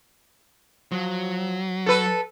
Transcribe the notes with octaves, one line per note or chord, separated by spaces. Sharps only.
F3 F#3
A4 B4